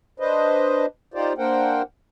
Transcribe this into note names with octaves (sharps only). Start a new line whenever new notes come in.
D4 B4 C5 D#5
D#4 F4 G4 C5 D5
A#3 D4 A#4 C5 F#5 G5